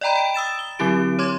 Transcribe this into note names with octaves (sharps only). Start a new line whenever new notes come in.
D5 D#5 G5 A#5 B5
G5 D7
D#6 E6 A6 E7
G7
D3 F#3 C4 E4 G4 D7
C#5 C6 D6 G#6